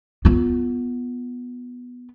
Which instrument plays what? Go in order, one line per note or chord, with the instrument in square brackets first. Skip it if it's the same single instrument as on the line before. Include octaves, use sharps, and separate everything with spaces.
[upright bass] B3 F4